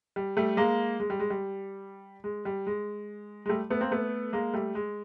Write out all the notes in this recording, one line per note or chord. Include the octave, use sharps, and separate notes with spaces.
G3
G3 A3
G#3 A#3
G#3
G3
G#3
G3
G#3
G3
G#3
G#3
G3 A3
A3 B3
A#3 C4
A3 B3
G#3 A#3
G3 A3
G#3